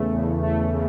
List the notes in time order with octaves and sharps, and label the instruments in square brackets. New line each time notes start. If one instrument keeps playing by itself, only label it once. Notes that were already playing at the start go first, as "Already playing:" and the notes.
Already playing: [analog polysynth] E2 C#3 E3 A3
E2
A3
C#3